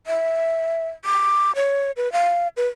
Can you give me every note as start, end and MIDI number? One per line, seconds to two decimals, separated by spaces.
0.07 0.88 76
1.05 1.52 86
1.56 1.91 73
1.97 2.11 71
2.12 2.48 77
2.57 2.67 71